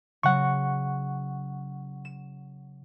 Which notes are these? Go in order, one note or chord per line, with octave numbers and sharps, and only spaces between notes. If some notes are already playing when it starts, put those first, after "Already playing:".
C#3 F#3 F#5 C#6
E7